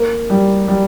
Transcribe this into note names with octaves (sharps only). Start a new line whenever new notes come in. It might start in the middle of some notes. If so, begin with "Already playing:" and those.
Already playing: A#3
G3
G3